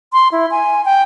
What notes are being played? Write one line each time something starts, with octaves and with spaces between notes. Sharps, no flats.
C6
E4
G#5
G5